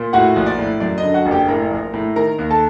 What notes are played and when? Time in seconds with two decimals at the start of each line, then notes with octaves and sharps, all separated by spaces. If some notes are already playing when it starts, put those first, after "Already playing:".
Already playing: A#2
0.13 A2 F#4 F#5
0.36 A#1
0.46 D5
0.58 A2
0.80 F#2 D5
0.98 D#5
1.03 D3
1.14 F#4 F#5
1.26 F#1
1.31 G4 G5
1.48 A2 A#4 A#5
1.71 A#1
1.93 A2
2.16 D#3 A#4 A#5
2.38 D#2
2.50 A4 A5